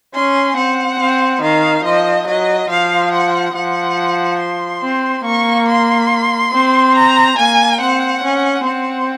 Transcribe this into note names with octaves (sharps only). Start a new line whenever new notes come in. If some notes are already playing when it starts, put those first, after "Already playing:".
C#4 C6
C4 F#5
C4
D#3 F5
F3 D#5
F#3 D#5
F3 F5
F#5
F3 F#5
C6
C4
A#3 C#6
C6
C4
A#5
A#3 G#5
C4 F#5
C#4
C4 F#5